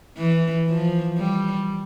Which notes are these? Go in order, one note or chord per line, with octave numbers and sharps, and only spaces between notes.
E3
F3
G3